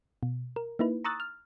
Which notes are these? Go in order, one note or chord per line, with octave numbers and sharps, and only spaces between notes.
B2
A#4
A#3 D#4 E4 B4
A#5 C#6 D#6 E6 F#6 A6
F6